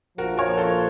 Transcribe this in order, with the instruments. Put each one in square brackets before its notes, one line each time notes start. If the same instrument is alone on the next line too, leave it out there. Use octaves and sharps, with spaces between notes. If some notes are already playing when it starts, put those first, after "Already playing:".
[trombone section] A#1 A#2 F3 [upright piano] F#4 A#4
[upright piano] A#4 C#5
A4 C5